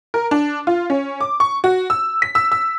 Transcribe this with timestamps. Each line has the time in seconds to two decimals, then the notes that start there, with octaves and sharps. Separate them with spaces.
0.14 A#4
0.31 D4
0.67 F4
0.90 C#4
1.20 D6
1.40 C#6
1.64 F#4
1.90 E6
2.22 B6
2.35 E6
2.52 E6